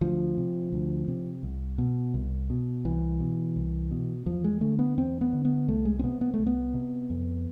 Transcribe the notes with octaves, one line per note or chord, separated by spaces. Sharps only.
D2 F3
C3
D2
C3
C2
B2
C2
B2
C2 E3
B2
C2
B2
E2 F3
G#3
D3 A3
B3
E2 C4
B3
D3
B3
C2 A3
G#3
C4
C3 B3
B3
A3
C2
B3
C3
F2